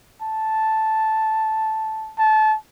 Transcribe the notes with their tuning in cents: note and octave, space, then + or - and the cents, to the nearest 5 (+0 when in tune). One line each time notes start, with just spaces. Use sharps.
A5 -5
A5 -25